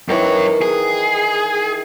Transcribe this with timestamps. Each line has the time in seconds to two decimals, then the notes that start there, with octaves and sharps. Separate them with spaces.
0.08 F#2 D#3 E3 C#5
0.61 G#4